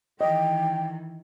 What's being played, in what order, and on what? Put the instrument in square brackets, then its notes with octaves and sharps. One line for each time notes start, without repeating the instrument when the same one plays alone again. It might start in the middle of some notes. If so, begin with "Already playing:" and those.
[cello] D#3 E3 [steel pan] D#5 [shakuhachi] G5